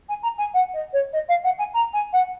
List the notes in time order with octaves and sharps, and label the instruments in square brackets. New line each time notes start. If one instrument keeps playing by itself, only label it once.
[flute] G#5
A#5
G#5
F#5
D#5
C#5
D#5
F5
F#5
G#5
A#5
G#5
F#5